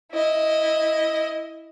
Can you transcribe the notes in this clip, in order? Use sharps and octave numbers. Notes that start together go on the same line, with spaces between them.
E4 D#5